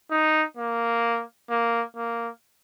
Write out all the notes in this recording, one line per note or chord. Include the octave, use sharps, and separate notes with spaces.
D#4
A#3
A#3
A#3